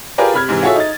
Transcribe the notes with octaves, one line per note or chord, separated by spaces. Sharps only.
F4 G4 G#4 A#4 B4 D5
C3 B5 F6 G#6
G#2 C3 E3
F4 F#4 G#4 A4 C#5 E5
D#4 A6